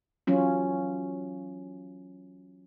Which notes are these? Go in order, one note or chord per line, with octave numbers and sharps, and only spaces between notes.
E3 F#3 C#4 F4